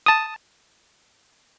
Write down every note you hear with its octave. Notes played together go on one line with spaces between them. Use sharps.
A5 D#6